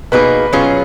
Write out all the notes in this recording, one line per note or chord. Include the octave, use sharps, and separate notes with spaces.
B2 A#3 D#4 G#4 B4
B2 F#3 C#4 F4 G#4